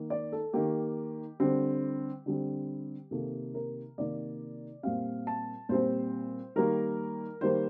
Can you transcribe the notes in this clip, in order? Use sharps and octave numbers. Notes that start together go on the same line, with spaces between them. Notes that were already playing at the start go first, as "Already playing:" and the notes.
Already playing: D#3 A#3
D5
A4
D#3 A#3 G4
D3 G3 C4
D3 G3 C4
C3 D#3 A#3 A4
A#4
C3 D#3 A#3 D5
A#2 G3 C4 F5
A5
A#2 G3 C4 C5
D#3 G3 A#3 A#4
D#3 G3 A#3 C5